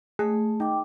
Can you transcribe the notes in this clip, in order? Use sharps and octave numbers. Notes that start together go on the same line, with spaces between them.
A3 G#4
D#4 G5 D6